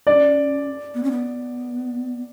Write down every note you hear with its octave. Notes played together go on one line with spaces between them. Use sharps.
C#4 D4 D5
B3
C#4
B3